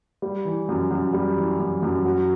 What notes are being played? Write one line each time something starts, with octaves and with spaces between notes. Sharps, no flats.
G3
E3
F#2
F#2
G3
E3
F#2
F#2
F#3